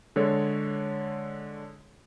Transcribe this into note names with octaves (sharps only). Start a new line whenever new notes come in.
D3 G#3 A4 C#5